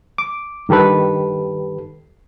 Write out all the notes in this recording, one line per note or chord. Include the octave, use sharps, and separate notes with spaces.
D6
G2 D#3 G4 A4 B4